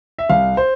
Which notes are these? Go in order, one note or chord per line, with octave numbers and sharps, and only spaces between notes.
E5
C2 F5
C5